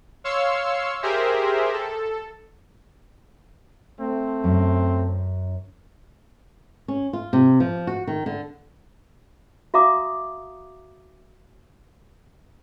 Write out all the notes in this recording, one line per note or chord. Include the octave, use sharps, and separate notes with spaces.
C#5 F5 C6 E6 C#7
G4 G#4 A#4 C5 E5
A4
A3 C4
F#2
C#4
F4
C3
F3
F#4
D#3
D3
F#4 E5 F5 A#5 D6 D#6